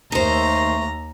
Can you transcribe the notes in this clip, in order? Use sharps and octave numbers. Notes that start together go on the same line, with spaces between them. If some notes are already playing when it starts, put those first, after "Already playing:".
D#2 A3 D#4 C5 A#5